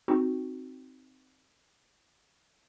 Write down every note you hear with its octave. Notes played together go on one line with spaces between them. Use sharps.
C4 D#4 F#4